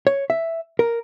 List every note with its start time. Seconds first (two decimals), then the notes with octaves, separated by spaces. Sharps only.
0.07 C#5
0.30 E5
0.79 A#4